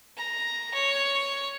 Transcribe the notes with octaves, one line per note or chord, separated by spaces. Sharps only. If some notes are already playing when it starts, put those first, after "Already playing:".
A#5
C#5